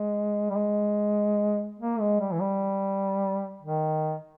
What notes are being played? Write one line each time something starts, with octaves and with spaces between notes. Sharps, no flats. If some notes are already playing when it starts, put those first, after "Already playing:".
Already playing: G#3
G3
G#3
A#3
G#3
G3
E3
G3
D#3